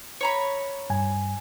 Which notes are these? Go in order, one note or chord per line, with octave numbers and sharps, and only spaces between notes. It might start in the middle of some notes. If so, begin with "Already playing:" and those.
C#5 A#5 B5
G2 G#5